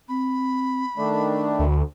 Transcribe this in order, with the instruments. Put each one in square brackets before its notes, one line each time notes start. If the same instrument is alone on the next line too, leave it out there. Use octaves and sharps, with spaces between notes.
[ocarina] C4 [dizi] B5
[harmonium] D#3 A3 D4 [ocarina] D5
[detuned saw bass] D2